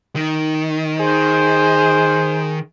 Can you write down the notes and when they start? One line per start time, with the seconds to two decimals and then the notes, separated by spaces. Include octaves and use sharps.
0.16 D#3
0.99 G#4 C5